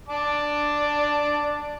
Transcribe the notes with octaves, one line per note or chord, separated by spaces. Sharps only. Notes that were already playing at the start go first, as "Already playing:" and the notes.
D5 A5 D6